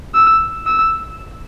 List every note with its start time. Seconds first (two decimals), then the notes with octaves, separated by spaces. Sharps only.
0.15 E6
0.66 E6